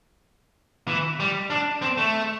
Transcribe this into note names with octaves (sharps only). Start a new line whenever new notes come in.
E3
G3
D4
C4
A3